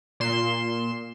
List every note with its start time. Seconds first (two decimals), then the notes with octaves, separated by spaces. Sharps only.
0.20 A#2 C6 E7